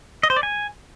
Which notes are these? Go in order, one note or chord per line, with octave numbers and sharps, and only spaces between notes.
D#5
C5
D5
G#5